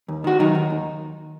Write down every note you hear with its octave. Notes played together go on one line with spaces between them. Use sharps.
D#2
D#3 F#4
D#3 F#3 D#4
D#2
D#2